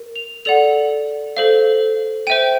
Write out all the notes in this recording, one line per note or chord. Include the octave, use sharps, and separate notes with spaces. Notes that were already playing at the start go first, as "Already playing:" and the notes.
Already playing: A#4
F7
A4 D5 F#5 F7
A4 C5 F5
C5 E5 G5 D#7